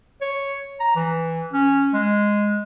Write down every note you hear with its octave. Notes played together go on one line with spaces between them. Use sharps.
C#5
A#5
E3
C#4
G#3